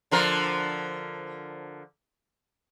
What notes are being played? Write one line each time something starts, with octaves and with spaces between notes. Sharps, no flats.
D3 F3 A#4